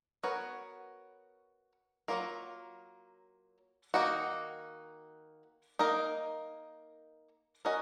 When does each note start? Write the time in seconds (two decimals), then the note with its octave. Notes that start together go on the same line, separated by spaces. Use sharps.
0.23 B3 F#4 A#4 C#5
2.08 F#3 A#3 F4 A#4
3.94 D#3 A#3 D#4 F#4
5.79 A#3 D#4 A#4 D#5
7.65 C#4 F#4 A#4 D#5